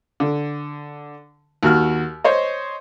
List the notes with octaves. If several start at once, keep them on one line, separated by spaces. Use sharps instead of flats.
D3
D#2 F#4 F6
C5 C#5 D#5